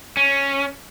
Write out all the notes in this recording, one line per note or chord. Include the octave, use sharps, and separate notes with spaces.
C#4